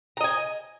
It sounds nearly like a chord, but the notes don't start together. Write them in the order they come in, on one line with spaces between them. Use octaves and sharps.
A#5 D#5 G#5